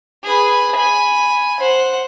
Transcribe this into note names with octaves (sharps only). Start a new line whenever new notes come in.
G#4 B4
G#5 B5
C5 F#5